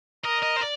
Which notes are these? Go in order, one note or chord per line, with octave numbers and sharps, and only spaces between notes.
A#4 D#5
D#5
C5
D5